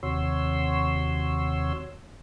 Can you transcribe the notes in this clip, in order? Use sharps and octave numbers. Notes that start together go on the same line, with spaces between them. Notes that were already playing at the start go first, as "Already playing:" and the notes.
D#2 C3 F#4 C#5 C6 E6